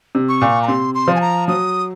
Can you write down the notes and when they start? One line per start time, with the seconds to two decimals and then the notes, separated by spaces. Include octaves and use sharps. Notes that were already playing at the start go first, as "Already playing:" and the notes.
0.15 C3
0.29 C#6
0.41 A#2
0.62 A#5
0.67 C3 C6
0.94 C6
1.08 F3
1.15 G#5
1.21 A#5
1.48 F#3 D#6